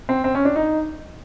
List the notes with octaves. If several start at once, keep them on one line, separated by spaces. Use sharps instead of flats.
C4
C4
C#4
D4
D#4